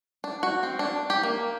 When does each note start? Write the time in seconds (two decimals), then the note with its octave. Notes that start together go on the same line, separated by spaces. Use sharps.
0.24 D4
0.43 F#4
0.63 C4
0.79 D4
1.10 G4
1.23 A#3